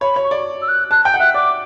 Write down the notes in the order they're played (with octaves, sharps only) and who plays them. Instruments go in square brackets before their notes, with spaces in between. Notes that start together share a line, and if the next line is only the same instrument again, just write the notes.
[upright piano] C#5 [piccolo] B5
[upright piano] C#5
[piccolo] C#6
[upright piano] D5
[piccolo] E6
F#6
[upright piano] A5 [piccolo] F#6
[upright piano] G5 [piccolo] G6
[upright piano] F#5
[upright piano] E5 [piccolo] F#6
[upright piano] D5 [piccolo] D6